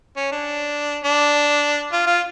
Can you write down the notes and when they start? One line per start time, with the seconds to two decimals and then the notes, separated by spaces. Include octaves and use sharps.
0.17 C#4
0.32 D4
1.04 D4
1.93 F4
2.07 F4